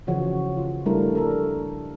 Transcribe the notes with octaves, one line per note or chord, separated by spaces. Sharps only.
C#3 E3 F3 F#4 C#5
F4
F3 G3 A3 D4 E4 A#4
A4 A#4